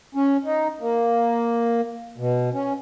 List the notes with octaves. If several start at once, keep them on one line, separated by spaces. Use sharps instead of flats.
C#4
D#4
A#3
B2
C#4